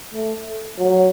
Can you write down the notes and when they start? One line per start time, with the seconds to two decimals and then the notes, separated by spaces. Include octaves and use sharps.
0.14 A3
0.78 F#3